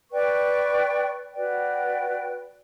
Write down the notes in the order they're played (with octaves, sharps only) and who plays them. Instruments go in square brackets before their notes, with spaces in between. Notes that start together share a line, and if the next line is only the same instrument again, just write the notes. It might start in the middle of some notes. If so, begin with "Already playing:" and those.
[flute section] B4 D5 G5 C#6
F#4 B4 D5 G5